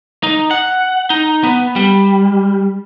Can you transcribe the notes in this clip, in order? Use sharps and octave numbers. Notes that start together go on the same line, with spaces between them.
D#4
F#5
D#4
B3
G3